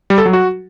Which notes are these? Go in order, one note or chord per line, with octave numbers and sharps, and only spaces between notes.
G3
A4
F#3
F#4